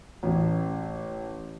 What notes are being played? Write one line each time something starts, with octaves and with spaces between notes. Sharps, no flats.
A1